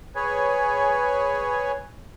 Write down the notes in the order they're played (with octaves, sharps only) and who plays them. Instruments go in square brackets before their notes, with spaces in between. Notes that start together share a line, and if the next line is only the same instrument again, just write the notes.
[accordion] G#4 B4 C#5 G#5